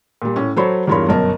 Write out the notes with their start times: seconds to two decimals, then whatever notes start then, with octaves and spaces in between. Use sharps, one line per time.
0.22 A#2 G3
0.36 A2 C#4
0.56 F#3 A4 C5 C#5 B5
0.87 E2 G2 F4 A#4 C#5 B5
1.08 G1 F#2 B2 A#4 A5